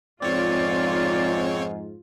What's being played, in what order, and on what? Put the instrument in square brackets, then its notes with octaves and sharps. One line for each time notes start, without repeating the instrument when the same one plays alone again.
[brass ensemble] F2 G#2 [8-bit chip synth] C4 C#5 [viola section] F4 [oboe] D5